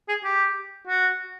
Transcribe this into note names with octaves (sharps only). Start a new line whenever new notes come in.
G#4
G4
F#4